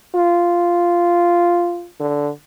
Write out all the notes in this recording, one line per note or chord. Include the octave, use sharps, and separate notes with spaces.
F4
D3